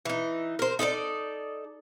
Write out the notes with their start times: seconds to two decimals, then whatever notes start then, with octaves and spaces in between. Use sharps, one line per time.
0.05 E3 D#4
0.59 A#4 C5
0.79 D#4 A4 B4 D5